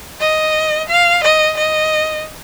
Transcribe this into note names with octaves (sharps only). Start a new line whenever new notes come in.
D#5
F5
D#5
D#5